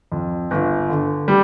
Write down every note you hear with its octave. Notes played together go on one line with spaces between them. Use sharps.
F2
G1
D3
G3